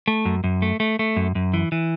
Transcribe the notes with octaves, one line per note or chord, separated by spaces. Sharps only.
A3
F#2
F#2
A3
A3
A3
F#2
F#2
E3
E3